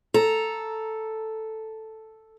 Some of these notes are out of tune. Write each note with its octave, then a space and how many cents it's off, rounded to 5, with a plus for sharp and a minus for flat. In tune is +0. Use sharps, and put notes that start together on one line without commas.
A4 +0 A#5 +0